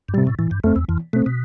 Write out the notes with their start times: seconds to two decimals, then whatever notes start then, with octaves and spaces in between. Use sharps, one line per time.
0.09 G2
0.14 A2 C3 G3
0.27 A2
0.39 A2 E3
0.51 G2
0.64 F2 A3 C4
0.76 E2
0.88 F2 E3
1.13 B2 A3 C4
1.26 B2